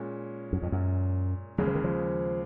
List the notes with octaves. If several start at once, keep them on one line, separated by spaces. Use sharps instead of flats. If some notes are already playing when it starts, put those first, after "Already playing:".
Already playing: A#2 G#3 C#4
F#2
F2
F#2
D#2 C#3 F#3 G#3
F3
D#3
F3